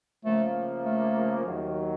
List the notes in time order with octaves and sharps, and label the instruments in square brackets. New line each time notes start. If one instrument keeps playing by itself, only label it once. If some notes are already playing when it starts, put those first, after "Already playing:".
[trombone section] C#3 F3 A#3 [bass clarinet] A3
[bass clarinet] A3
[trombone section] D#2 D#3 F#3